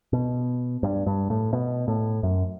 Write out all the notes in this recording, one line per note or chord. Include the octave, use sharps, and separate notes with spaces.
B2
G2
G2
A2
B2
A2
F#2